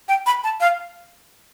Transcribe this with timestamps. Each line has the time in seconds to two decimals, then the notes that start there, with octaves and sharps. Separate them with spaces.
0.08 G5
0.26 B5
0.44 A5
0.60 F5